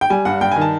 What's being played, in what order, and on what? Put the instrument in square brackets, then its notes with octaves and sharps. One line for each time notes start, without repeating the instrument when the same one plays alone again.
[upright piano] G5
G3 G#5
G2 F#5
G2 G5
D#3 G#5
A5